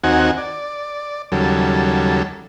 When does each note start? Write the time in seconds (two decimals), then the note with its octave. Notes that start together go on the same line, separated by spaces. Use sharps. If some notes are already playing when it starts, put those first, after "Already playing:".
0.04 D#2 C4 D#4 F#4 F#5 G#5
0.38 D5
1.32 D#2 C#3 F#3 G3 A4